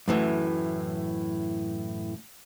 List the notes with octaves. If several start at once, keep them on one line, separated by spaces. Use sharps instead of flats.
F#2 A2 E3